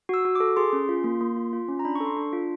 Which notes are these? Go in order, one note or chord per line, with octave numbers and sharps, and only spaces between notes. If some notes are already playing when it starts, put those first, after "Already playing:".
F#4 E6
F#4
A4 D6
G#4 C6
C#4
F4
A#3
A#3
F4
F4
C#4
A#5
D4 B5
A4 C#6
C6
D4
F4